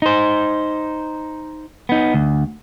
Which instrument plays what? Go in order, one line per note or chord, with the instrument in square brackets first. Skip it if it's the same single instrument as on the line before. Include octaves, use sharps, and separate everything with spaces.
[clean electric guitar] D#4 C5
B3 D#4
D2